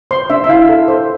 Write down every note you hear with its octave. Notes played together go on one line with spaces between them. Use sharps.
C5 C6
D4 E5
E5
E4 F5
A4
C5